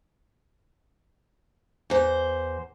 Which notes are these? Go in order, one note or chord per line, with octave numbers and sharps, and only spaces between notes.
E2 C5